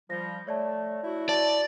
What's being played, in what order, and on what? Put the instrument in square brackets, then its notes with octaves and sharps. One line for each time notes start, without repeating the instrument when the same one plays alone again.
[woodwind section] F3 G3 [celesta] A#6
[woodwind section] A3 [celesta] C#5 D5 A5
[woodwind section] E4 F#4
[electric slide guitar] D5 [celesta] A5